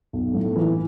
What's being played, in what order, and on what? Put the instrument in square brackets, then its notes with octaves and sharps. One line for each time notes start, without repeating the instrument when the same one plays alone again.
[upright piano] B1
A2
E3